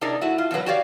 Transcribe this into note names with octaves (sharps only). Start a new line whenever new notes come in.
C3 D4 D#4 G#4 A#4 D5
A3 E4 F#4
F4
F2 B2 D3 F#3 B4
F#4 G4 C#5 D5 F5